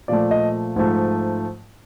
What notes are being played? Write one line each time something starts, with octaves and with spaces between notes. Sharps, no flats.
A#2 F3 A3 D5
D#5
G#2 F3 A3